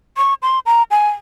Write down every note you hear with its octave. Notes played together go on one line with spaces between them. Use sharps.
C#6
C6
A#5
G#5